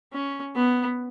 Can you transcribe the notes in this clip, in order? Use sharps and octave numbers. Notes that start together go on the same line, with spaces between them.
C#4
B3